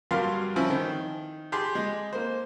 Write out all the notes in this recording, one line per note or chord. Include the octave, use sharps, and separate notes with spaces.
G2 F#3 G3 A#4 F5 C6
F3 C4 C#4 E4
D#3
G4 G#4 A5 C6
G#3
A#3 C5